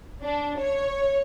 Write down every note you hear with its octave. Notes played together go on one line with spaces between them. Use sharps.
D4
C#5